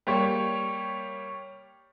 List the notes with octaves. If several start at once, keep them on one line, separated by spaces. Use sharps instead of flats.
G3 A#3 G4 C#5